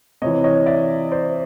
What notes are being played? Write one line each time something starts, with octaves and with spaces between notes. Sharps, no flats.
C3 E3 C#5 D#5
C#5 D#5
D5 E5
C5 D5